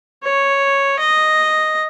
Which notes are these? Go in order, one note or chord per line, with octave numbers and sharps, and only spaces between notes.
C#5
D#5